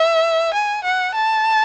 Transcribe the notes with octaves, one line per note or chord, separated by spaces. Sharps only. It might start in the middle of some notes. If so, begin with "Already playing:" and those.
Already playing: E5
G#5
F#5
A5